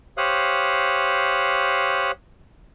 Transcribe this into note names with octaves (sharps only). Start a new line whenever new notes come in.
G4 C5 C#5 F5 D#6 F#6